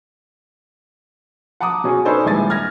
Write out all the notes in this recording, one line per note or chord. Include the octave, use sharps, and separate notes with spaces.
F#5 A5 A#5 D6 D#6
B2 C#4 G#4
C#4 D#4 A4 B4 C5 D5
D#1 G#3 E4 G#5 A6
F6 G#6 A#6